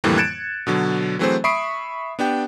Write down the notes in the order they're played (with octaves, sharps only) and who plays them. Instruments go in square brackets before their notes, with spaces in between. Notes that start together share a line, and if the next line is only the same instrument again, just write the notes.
[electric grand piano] F2 A2 D3 E3 G3 A#3
F#6 G#6 A6 C#7 D7 E7
B2 D3 F#3
E3 F#3 A3 C4 G#4 C5
E5 B5 C#6 D#6 C7 D7
B3 D4 G4 G5